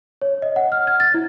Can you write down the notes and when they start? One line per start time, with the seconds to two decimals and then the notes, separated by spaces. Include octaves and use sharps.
0.22 C#5
0.42 D#5
0.56 F#5
0.72 F6
0.87 G#6
1.00 A6
1.14 E4